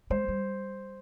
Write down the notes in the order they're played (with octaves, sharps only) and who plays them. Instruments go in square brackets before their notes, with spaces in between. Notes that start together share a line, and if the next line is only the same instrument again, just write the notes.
[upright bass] G#3 [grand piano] C5
[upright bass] G3